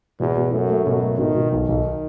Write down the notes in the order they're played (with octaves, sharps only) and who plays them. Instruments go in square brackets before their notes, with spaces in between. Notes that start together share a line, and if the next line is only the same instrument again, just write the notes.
[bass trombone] E2 [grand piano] B2
[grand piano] B2
[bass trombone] F#2 [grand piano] A3
[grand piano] A3
[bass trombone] F#2 [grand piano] B2
[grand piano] A3
[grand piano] B2 [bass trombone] D#3
[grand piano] B2
[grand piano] B1 [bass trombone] D#3
[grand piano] B1